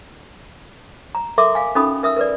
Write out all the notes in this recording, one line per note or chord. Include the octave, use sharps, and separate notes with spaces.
A#5
A4 A#4 E5 C6 D6
F5 G#5
C#4 D#4 F#4 A4 B5 D#6
A#4 E5 D#6 E6
A#4 B4 D5